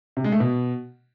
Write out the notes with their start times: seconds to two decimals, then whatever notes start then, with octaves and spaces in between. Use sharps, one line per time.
0.17 C3
0.24 G#3
0.32 A3
0.40 B2